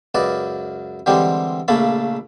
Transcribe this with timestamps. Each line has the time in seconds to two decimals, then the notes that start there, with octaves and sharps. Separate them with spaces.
0.15 C#2 F#2 B4 D5 D#5
1.06 D3 E3 G3 G#3 C4 G4
1.68 A#1 C#3 A3 A#3 A5 B5